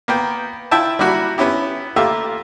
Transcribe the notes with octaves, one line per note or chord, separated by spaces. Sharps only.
A#3 B3 G5
E4 F4 E5 G5 A5
G3 A#3 E4 F#4
B3 C#4 E4 G4
A3 A#3 F4 G4 E5